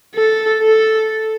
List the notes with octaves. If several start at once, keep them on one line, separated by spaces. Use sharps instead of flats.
A4
A4